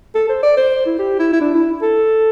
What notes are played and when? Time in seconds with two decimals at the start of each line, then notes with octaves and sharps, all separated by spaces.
0.15 A4
0.29 C5
0.43 D5
0.57 C5
0.86 E4
0.99 G4
1.19 E4
1.33 E4
1.41 D4
1.54 E4
1.82 A4